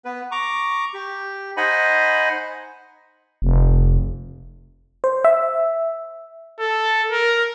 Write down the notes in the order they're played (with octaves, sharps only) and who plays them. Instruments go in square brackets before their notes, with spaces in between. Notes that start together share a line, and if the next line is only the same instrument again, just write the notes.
[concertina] B3 B4
A#5 C#6 D6
G4
D#4 C5 D#5 F#5 G#5 B5
[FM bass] F1
[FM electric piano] C5
E5
[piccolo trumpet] A4
A#4